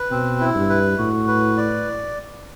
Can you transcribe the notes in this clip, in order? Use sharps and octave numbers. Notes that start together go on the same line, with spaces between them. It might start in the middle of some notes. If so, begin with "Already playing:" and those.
Already playing: B4
B2 C4
E4
G2
B4
A2 F#4
B4
D5